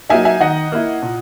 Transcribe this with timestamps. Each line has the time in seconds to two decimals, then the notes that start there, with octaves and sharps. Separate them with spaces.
0.10 F#3 A#3 D#4 E5 G#5
0.25 E5 G#5
0.40 D#3 D#5 F#5
0.72 A#3 E4
1.02 A#2